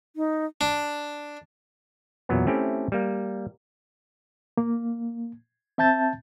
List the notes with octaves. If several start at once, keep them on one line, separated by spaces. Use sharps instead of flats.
D#4
D4
E2 A#2 F#3 B3
A3 C4 C#4 E4 G4
G3 A#3
A#3
C4 E5 A5 G6 A6